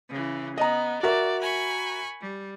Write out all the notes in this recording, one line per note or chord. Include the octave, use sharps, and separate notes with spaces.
C#3 E3
B3 D#5 A#5
F#4 A#4 D5 E5
G#5 B5 C#6
G3